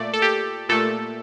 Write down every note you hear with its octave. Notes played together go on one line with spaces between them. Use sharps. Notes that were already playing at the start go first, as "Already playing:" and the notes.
Already playing: A#2 A3 D5
A4
G4
A#2 A3 A4